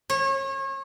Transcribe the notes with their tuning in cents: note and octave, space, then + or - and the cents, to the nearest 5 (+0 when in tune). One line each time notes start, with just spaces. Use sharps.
C#5 -35